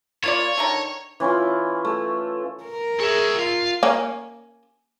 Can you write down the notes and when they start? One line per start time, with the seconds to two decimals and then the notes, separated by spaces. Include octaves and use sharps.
0.24 A#3 F4 C#5 D5
0.58 D3 D#3 A#5
1.20 E3 C#4 E4 F4
1.85 A3
2.64 A#4
3.00 G#4 C#5 E5
3.39 F4 F5
3.83 A#3 C#4